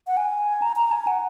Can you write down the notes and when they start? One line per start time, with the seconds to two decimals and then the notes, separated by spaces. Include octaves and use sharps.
0.07 F#5
0.17 G#5
0.62 A#5
0.76 A#5
0.92 G#5
1.07 F#5